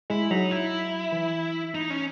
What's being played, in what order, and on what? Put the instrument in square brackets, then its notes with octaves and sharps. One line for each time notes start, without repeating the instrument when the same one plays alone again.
[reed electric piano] G#3 [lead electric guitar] E4
[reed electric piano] F#3 [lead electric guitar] D#4
[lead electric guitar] E4
[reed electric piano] E3
[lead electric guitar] D#4
C#4